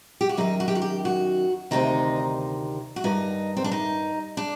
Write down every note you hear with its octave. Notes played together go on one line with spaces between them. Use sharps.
G4
F#4
F#2 D#3 D#4
F#4
G4
F#4
G4
F#4
D2 C3 D#3 D#4
F#4
G2 D#3 D#4
C4
D4
D#4
D4